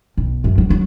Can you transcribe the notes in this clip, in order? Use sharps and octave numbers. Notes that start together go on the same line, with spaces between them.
B1
F#2
F#3
F#3